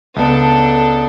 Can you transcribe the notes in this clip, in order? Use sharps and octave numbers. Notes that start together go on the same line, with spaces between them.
C#2 B3 D4 A4